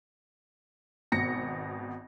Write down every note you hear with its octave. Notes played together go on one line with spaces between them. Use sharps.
G#1 B2 A#6 C#7